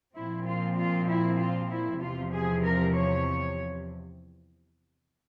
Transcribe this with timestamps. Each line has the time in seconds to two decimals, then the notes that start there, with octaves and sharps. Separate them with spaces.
0.16 A#2 F3 C4 E4
0.46 F4
0.78 F4
1.08 E4
1.39 F4
1.71 E4
2.01 E2 C3 F3 F4
2.33 G#4
2.63 A#4
2.94 C#5